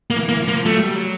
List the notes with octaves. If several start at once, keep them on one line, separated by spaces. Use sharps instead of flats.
A#3
E3
A#3
F3
A#3
F#3 A3
G3
F#3